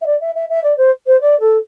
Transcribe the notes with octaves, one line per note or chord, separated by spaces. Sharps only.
E5
D5
E5
E5
E5
D5
C5
C5
D5
A4